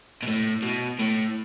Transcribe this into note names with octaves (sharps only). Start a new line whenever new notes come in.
B2
A2
B2
A2